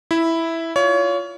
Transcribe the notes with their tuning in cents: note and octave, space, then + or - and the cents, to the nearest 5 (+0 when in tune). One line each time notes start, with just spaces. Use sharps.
E4 +0 E5 -5
F4 +0 C#5 +30